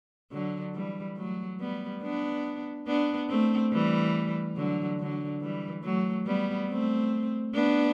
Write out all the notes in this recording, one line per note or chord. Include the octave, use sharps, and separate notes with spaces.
D3 F#3
E3 G3
F#3 A3
G3 B3
B3 D4
B3 D4
A3 C4
E3 G3
D3 F#3
D3 F#3
E3 G3
F#3 A3
G3 B3
A3 C4
B3 D4